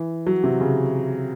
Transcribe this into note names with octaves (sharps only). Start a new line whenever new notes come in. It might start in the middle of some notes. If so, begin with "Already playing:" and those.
Already playing: E3
F#3
C3
C#3